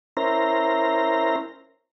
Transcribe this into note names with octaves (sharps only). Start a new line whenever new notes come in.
C#4 E4 A#4 C5 A#5